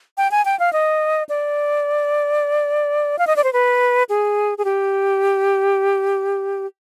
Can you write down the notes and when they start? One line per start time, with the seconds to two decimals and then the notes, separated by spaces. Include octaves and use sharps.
0.17 G5
0.31 G#5
0.45 G5
0.59 F5
0.73 D#5
1.29 D5
3.19 F5
3.27 D#5
3.36 D5
3.44 C5
3.53 B4
4.09 G#4
4.58 G#4
4.65 G4